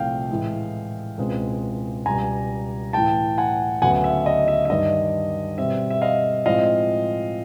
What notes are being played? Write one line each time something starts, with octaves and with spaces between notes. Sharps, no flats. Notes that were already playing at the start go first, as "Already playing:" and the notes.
Already playing: C2 A#2 F3 A3 C4 F5 G5
A2 E3 G#3
C#2 B2 G#3 C4
C#2 B2 G3 G#5 A#5
A2 E3 A3 G5 A5
F#5 G#5
D2 C#3 F#3 B3 F#5 G#5
E5
D#5
E5
E5
G2 D#3 G3 D#5
B2 G3 C4 E5
E5
D#5 F5
A2 F3 G#3 C4 D#5 F5